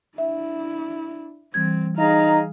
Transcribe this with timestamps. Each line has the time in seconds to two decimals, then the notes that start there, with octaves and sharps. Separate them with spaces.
0.18 D4 E4 E5
1.54 E3 G3 C4 G#6
1.98 D#4 G#4 F5 A#5